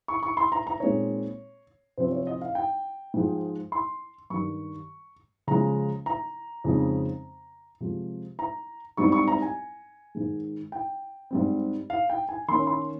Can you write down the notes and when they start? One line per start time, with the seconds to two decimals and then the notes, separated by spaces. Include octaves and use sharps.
0.08 C#6
0.23 C#6
0.37 C6
0.52 A#5
0.67 A#5
0.80 A#2 G#3 C4 D#4 C#5
1.97 C3 F3 C4 C5
2.12 C#5
2.27 D#5
2.42 F5
2.55 G5
3.14 G#2 F3 G#3
3.72 C6
4.30 G2 D#3 G3 C#6
5.47 C#3 F3 G#3 A#5
6.06 A#5
6.64 F2 C#3 G#3 C4 D#4
7.80 C3 F3 G#3
8.39 A#5
8.97 G#2 G3 C4 D#4 C#6
9.12 C#6
9.28 A#5
9.42 G#5
10.15 G#2 D#3 G#3
10.72 G5
11.31 G#2 G3 C4
11.90 F5
12.10 G5
12.29 G#5
12.48 D#3 A#3 C#4 C6
12.67 C6